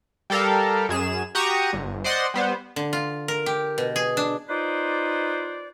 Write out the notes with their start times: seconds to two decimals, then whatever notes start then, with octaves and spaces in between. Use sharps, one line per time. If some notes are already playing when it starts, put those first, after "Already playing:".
0.30 G3 G4 A4 A#4 F5
0.89 F#2 G#4 E7
1.35 F#4 G4 A#5 C#6 D#6
1.73 G1
2.04 C5 D5 D#5 F#5 C6
2.34 G3 B3 C5
2.76 D3
2.93 F4
3.28 A#4
3.46 G4
3.78 B2
3.96 G#4
4.17 D4
4.49 D#4 F4 B4 C5 D5